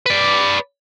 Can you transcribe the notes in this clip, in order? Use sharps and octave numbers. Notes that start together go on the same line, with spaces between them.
B4 D5